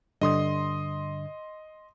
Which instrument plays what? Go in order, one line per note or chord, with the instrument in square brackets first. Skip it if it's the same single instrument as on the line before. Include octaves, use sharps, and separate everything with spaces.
[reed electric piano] G2 D3 [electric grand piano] D#5 C6 D#6